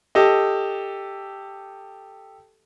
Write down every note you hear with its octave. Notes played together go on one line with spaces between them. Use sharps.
G4 A4 D#5